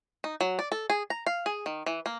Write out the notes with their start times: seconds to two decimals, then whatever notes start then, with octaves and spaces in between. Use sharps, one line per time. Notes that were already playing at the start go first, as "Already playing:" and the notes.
0.24 D#4
0.41 F#3
0.59 D5
0.72 A4
0.90 G#4
1.10 A#5
1.27 F5
1.46 G#4
1.66 D#3
1.86 E3
2.06 A#3